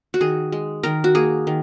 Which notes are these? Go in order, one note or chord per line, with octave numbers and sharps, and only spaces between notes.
F#4
D#3 G#4
G#3
D#3 A#4
F#4
A#3 G#4
D#3